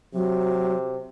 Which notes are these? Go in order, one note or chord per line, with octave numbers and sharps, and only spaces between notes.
C3 F#3